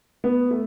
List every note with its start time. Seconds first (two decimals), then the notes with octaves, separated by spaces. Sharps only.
0.24 B3
0.51 A3